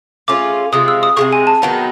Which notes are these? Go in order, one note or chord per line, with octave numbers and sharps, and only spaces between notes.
A3 C#4 F4 G#4 D6
C3 F3 G#3 D#6
E6
D#6
C3 F3 G#3 C#6
G#5
A5
D#3 F#3 B3 D#4